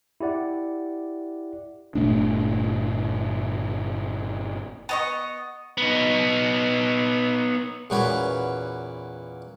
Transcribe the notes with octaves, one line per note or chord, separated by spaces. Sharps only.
E4 G4 D5 F#5
G1 A#2 A3 D4
B3 D#5 C#6
B3 D#4
E2 A#2 C#4 F#4 B4